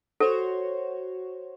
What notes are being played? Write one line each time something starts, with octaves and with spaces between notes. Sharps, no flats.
F#4 A4 C5 C#5